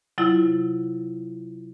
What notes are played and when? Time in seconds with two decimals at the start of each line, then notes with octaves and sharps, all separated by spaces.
0.18 C3 F#3 E4 F4